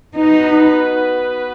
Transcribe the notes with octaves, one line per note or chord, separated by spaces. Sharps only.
B3 D#4 F#4 B4